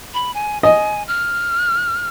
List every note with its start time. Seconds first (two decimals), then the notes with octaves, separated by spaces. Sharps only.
0.14 B5
0.34 G#5
0.63 D#5 G#5
1.08 F6